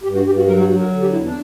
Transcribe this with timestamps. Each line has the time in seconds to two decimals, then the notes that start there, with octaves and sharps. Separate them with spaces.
0.03 G2 G4
0.14 F#4
0.25 G2 G4
0.37 F#4
0.47 F#3 A#4
0.58 F#4
0.69 F#3 F#4
0.80 A#4
0.90 D3
1.01 G4
1.12 E2 E4
1.23 D4